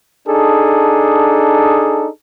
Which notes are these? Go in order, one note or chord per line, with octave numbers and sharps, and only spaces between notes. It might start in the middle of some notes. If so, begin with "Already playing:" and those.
D4 D#4 G#4 A4